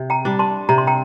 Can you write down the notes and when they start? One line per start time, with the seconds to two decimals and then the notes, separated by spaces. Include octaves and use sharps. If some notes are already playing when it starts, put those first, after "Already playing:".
Already playing: C3
0.10 G5 A#5
0.25 G3 D4
0.39 A5 C6
0.69 C3 A#5
0.78 C6
0.87 G5 A#5